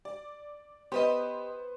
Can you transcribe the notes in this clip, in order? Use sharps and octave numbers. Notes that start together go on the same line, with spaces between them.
D5
B3 G4 B4 C5 D#5